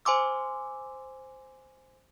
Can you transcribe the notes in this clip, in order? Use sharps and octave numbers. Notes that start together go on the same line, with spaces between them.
C5 G#5 C6 D6 E6